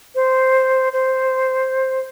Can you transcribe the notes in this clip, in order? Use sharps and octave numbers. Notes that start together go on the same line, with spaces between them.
C5
C5